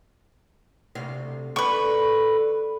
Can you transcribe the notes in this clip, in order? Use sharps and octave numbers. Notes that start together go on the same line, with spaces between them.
D2 C3 F5
D3 B4 C#6